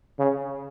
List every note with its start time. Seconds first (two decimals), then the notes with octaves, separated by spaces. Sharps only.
0.19 C#3